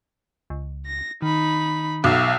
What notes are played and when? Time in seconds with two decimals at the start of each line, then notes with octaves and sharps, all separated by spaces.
0.50 C#2
0.87 A#6
1.22 D#3 D#4 B5
2.04 B1 E5 F5